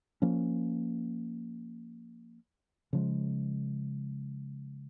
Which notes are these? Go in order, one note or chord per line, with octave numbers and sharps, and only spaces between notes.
F3 A#3 C#4
C#3 F3 G#3